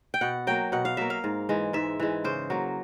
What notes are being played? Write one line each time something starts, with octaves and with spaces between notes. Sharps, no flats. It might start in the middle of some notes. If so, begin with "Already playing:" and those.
G5
B2 F#5
F#3 A#3 G5
B2 F#5
F5
F#3 A#3 E5
F5
G#2
E3 G#3
G#2 E5
E3 G#3
C#3 C5
F#3 A#3